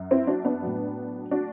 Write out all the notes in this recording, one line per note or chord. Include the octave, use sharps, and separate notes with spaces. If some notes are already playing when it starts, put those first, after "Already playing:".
Already playing: F#2
C4 E4
D4 F#4
B3 D4
A2 F#3
D4 F#4